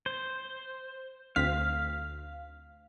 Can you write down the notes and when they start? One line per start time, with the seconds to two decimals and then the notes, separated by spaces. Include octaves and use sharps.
0.06 C5
1.36 D2 C4 F5 B6